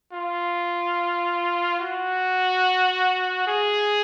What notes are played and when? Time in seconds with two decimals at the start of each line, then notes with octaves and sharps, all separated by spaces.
0.12 F4
1.80 F#4
3.47 G#4